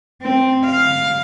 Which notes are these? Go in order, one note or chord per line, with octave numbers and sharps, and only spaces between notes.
C4
F5